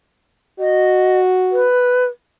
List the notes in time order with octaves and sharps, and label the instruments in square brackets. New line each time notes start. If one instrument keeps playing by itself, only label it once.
[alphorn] F#4 [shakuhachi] D#5
[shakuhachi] B4